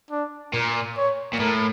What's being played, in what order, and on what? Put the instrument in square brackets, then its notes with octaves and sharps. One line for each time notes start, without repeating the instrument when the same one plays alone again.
[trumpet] D4
[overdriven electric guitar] A#2 [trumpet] A#4
[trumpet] C#5
[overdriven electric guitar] A#2
[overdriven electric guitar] A2 [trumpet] A#4